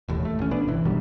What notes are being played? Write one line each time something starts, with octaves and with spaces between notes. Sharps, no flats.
E1 D#2 A2
A3
A1 C#4
A#2 B3 D4
G1 C3 E3
G2 B2 D#3 G3